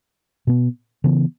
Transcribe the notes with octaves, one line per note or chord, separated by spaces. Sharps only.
B2 B3
C#3 E3 B3